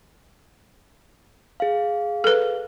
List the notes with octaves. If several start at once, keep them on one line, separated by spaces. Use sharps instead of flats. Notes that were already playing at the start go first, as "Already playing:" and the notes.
G#4 F5
A4 B4